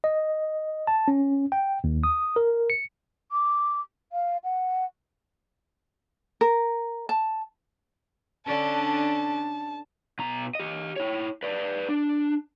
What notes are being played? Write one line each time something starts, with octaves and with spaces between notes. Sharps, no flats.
D#5
A5
C#4
G5
D#2
D#6
A#4
C#7
D6
F5
F#5
A#4
A5
D3 C#4 D4 A5
B2 A#5
G4 D#5
E4 C#5
B4 D5
D4